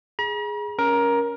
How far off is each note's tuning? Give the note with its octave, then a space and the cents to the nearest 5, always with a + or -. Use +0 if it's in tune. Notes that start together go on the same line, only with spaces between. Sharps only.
G#4 +0 A#5 +45
C#4 +5 A#4 +15